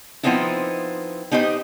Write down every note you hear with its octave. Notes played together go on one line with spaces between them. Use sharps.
F3 G#3 B3 C4 D#4 E4
B3 D#4 G4 C5 D#5